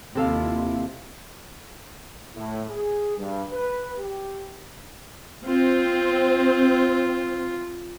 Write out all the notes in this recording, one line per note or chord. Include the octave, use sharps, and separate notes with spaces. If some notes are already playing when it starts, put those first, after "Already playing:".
D#2 C3 E4 F4 A4 F5
A2
G#4
G2
B4
G4
C4 F4